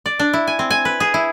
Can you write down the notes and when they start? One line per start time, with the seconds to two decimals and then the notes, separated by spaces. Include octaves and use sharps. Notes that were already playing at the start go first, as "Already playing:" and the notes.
0.06 D5
0.19 D4
0.34 E4
0.47 G#5
0.59 C4
0.70 G#5
0.85 B4
1.00 G#4
1.14 E4